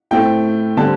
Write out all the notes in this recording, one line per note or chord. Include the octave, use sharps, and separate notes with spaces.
A2 A3 C4 G5
D3 G3 C4 A5